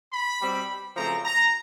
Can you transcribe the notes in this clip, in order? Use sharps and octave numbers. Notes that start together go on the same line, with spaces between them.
B5
B2 G3 C4
F#2 C#3 F3 A3 C4 A#5
A#5